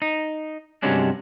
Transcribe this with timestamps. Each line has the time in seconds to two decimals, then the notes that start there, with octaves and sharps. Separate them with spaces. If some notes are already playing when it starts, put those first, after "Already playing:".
0.02 D#4
0.82 G2 C3 F#3 G#3 C#4 D4